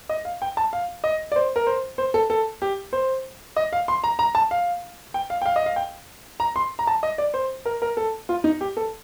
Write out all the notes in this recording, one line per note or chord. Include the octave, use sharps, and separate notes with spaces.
D#5
F5
G5
A5
F5
D#5
D5
C5
A#4
C5
C5
A4
A4
G4
C5
D#5
F5
C6
A#5
A#5
A5
F5
G5
F5
G5
F5
D#5
F5
G5
A#5
C6
A#5
A5
D#5
D5
C5
A#4
A#4
A4
F4
D#4
G4
A4